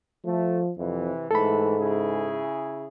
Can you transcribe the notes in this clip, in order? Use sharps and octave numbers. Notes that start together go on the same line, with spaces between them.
F3 A3
F2 C3 E3
G#2 E3 A3 A4 B5
C#3 E4 G#4